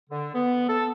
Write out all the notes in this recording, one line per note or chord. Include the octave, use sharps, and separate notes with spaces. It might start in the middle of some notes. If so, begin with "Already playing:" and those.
D3
B3
A4